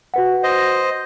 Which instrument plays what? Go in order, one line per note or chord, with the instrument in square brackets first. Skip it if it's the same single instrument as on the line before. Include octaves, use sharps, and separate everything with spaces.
[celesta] F#4 B4 F#5
[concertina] C5 D#5